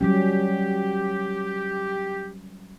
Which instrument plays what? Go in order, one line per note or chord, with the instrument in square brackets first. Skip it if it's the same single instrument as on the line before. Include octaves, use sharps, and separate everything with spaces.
[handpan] F#3 G3 C#4 [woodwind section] G4